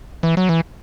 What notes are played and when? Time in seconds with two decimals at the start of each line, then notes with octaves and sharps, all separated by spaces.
0.23 E3
0.37 F#3
0.49 E3